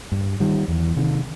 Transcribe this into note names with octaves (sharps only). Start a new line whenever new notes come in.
G2
D#3 G3
E2
C3 D#3